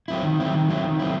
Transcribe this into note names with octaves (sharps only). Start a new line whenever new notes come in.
F#3 C4 E4
D#3
F#3 C4 E4
D#3
F#3 C4 E4
D#3
F#3 C4 E4